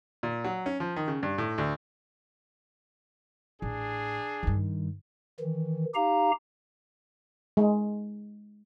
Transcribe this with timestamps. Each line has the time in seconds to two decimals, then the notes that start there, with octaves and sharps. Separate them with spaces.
0.23 A#2
0.44 F#3
0.66 C#4
0.80 F3
0.96 D#3
1.08 C#3
1.23 G2
1.38 A2
1.58 D2
3.62 A1 D4 G#4
4.43 G2 D#3
5.40 D#3 E3
5.95 D#4 G4 F5 A#5
7.57 G#3